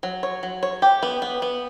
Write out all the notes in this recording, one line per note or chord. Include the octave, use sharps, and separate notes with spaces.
F#3
C#5
F#3
C#5
G4
B3
B3
B3